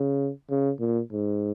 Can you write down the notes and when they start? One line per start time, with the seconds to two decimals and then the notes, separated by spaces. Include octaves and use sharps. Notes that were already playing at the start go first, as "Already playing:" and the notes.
Already playing: C#3
0.50 C#3
0.80 A#2
1.12 G#2